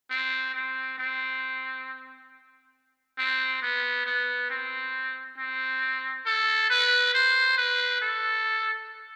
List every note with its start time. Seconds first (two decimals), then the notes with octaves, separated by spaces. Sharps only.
0.10 C4
0.55 C4
0.98 C4
3.18 C4
3.62 B3
4.06 B3
4.50 C4
5.38 C4
6.26 A4
6.70 B4
7.14 C5
7.58 B4
8.02 A4